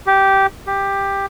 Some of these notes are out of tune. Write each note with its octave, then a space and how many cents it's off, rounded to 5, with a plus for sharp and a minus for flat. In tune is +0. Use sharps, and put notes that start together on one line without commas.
G4 -10
G4 +10